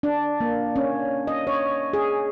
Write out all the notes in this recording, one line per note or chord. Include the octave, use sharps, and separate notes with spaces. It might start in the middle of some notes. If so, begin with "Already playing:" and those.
D4
A#3
C#4
D#5
C#5
G#4